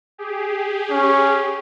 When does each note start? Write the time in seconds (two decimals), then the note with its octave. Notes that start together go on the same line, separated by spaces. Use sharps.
0.18 G4 G#4
0.90 C#4